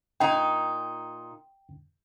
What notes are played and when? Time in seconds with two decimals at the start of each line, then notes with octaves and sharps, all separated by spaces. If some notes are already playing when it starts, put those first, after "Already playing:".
0.20 A#2 D#4 G5